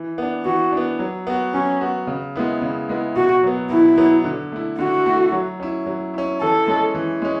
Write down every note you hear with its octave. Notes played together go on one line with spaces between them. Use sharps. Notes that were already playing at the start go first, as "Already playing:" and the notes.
Already playing: E3
B3 D4
E3 F#4
B3 D4
F#3
B3 F#4
F#3 C#4
B3 F#4
C#3
G#3 B3 E4
C#3
G#3 B3 E4
B2 F#4
F#3 B3
B2 E4
F#3 B3
D3
A3 E4
D3 F#4
A3 E4
F#3
C#4 E4
F#3
C#4 E4
E3 A4
G#3 C#4
E3
G#3 C#4